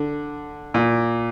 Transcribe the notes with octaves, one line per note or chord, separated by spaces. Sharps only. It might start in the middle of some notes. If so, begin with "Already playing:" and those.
Already playing: D3
A#2